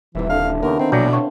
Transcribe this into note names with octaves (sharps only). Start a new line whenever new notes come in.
D#1 C3 E3 E5
D3 E4 F5
D#2 C#3 B3 A#4
D#3 C4
A#1 B2 F#3 D5 G5
C4 D4 C#5 F5